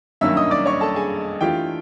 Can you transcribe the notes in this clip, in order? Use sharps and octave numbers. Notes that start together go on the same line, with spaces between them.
G2 D#3 F#3 A#3 C#4 E5 E6
D#5 D#6
D5 D6
C#5 C#6
A4 A5
G#4 G#5
E3 A3 D4 F4 G4 G5